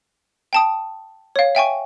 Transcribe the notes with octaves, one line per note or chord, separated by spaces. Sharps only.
G5 A5 D#6
C#5 F5
E5 G5 G#5 C#6